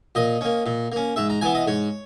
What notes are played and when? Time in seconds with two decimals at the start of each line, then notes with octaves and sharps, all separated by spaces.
0.15 A#2 D#5
0.41 A#3 C#4
0.66 A#2
0.92 A#3 C#4
1.16 G#2 E5
1.30 A#5
1.41 E3 B3 G#5
1.55 D#5
1.67 G#2 C#5